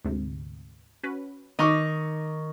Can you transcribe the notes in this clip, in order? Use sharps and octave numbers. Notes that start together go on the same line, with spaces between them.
D2 G#2 C3
C#4 F#4 B4
D#3 D#4 D#5 C#6 D6